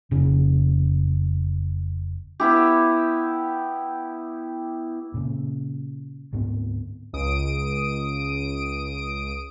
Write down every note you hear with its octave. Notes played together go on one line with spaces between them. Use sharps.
F1 C#3
B3 E4 G4
A#2 C#3
D2 G#2 B3 C4
C#2 D#6 D7